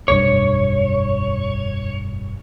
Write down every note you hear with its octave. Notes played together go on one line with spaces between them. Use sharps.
F1 B1 G2 C#5